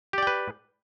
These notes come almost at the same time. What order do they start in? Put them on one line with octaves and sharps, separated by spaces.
G4 D5 G5 B4